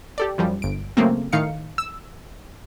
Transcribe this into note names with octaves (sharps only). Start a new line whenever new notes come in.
G4 A4 D5
F#2 F3 G3
G1 D7
C#3 F#3 A3 A#3 C4
A2 D#3 D#4 F5 C#7
E6